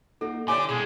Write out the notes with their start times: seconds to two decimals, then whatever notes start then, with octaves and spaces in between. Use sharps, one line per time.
0.21 A#3 D#4 F#4 A4
0.48 D3 E4 G4 C#5 D5 G#5 D6
0.69 G2 B2 G#3 G#4